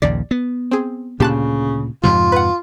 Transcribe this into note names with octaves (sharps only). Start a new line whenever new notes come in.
A#1 D#2 C#3 D5
B3
C4 G#4
D2 A#2 C#3 G4 A5 F#6
F2 G#2 C3 F3 F4
B4 F#5